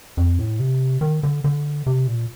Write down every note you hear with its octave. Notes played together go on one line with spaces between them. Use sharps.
F2
A2
C3
D#3
D3
D3
C3
A#2